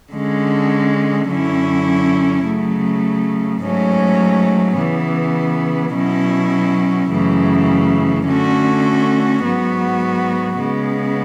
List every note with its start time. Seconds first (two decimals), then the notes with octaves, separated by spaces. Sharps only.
0.12 D3 G#3 C#4
1.29 F#2 D3 F#3 C#4 E4
2.46 C#3 F#3 A3
3.62 G#2 F#3 A3 C#4
4.77 C#3 E3 B3
5.93 B2 F#3 C#4 E4
7.09 F#2 C#3 E3 A3
8.26 D3 A3 C#4 F#4
9.43 G#2 F#3 B3 F#4
10.58 C#3 G#3 B3